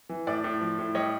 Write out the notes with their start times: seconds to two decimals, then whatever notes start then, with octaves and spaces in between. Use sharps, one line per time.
0.09 E3
0.27 A2 D5
0.44 A2
0.61 F3
0.79 A2
0.95 G3 C#5 D#5